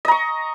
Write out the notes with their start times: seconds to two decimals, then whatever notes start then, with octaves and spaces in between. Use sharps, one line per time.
0.05 D#5
0.08 A#5
0.11 C#6